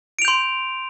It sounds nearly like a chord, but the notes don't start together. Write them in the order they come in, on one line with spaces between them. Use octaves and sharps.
D7 F7 G6 C6